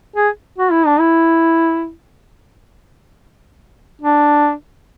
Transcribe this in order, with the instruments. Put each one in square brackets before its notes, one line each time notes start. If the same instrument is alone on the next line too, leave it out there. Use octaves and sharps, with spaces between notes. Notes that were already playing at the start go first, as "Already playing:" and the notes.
[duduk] G#4
F#4
E4
D4
E4
D4